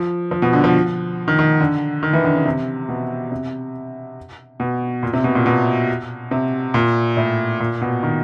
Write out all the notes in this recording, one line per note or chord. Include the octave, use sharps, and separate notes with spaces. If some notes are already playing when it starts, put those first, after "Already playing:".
Already playing: F3
F3
B2
D3
F3
D#3
D#3
D3
D#3
E3
D3
C#3
C3
B2
C3
B2
A#2
C3
B2
A#2
B2
C3
A#2
A2
A#2
B2
D#3